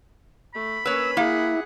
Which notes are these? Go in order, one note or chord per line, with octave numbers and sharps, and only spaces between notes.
A3 B5
A#3 C#4 B4 C#5 E6
A#3 E4 G#4 F#5